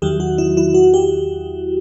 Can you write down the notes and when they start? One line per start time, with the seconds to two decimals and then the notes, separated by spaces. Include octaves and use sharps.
0.02 E2 D#3 F#3 G4
0.20 F#4
0.38 E4
0.57 E4
0.74 F#4
0.94 G4